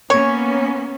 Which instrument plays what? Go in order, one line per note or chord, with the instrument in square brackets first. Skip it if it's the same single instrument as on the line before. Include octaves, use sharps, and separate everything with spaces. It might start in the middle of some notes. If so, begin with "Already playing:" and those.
[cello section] A#3 B3 C#4 [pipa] C#5